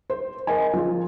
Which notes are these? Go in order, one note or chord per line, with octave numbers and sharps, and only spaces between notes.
C5
A#4 D#5 G#5
F3 F4